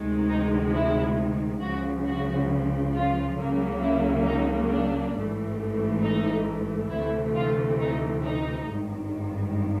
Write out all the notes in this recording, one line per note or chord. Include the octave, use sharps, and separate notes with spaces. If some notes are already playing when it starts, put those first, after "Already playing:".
Already playing: D2 C3 D#3 G#3
D#4
E4
C#2 C#3 F3 F#4
F#4
F4
C#2 C#3 F#3 A#3
E4
D#4
D4
A1 G#2 E3 A3
D#4
D2 C3 E3 A3 E4
F4
D#4
D#4
G#1 G2 D#3